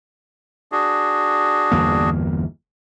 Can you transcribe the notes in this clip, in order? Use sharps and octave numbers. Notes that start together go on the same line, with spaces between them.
D4 F#4 G#4
G1 E2 A#3